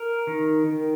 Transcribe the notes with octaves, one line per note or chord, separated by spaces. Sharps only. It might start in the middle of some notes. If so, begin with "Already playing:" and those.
Already playing: A#4
D#3
D#3